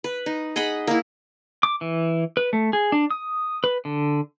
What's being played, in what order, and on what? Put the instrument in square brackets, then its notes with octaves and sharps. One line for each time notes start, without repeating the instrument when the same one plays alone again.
[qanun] B4
D#4
G#4 D#5 F#5 B5
A#3 E4
[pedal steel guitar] D6
E3
B4
A3
G#4
D4
D#6
B4
D3